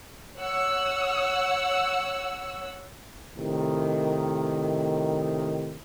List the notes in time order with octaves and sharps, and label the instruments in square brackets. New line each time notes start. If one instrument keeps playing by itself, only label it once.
[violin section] C#5 F#5 E6
[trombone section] A2 C3 D#3